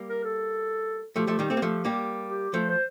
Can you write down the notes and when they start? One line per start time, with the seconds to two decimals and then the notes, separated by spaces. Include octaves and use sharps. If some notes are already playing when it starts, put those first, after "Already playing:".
Already playing: G3 A#3
0.09 A#4
0.24 A4
1.16 F3 A3 G4
1.27 F3 A3
1.39 D#3 G3
1.50 A3 C4
1.57 A#3
1.62 F3 A3
1.85 G3 A#3
2.30 G4
2.54 F3 A3 C5
2.69 C5